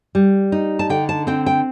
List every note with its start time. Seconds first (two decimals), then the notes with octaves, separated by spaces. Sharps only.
0.15 G3
0.52 D#4
0.79 A5
0.90 D3 G5
1.09 A5
1.27 C4 G5
1.46 G5